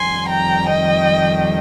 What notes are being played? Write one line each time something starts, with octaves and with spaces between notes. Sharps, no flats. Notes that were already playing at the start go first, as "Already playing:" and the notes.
Already playing: F2 D#3 G3 G#5 C6
G5 A#5
D#5 G5